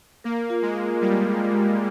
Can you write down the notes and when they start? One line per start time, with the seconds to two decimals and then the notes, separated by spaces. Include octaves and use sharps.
0.24 A#3 A#4
0.50 F4
0.62 G#3
0.76 A#4
1.01 G3 F4
1.26 G#3
1.52 G#3